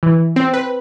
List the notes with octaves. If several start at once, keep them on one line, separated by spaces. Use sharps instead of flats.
E3
C4
B4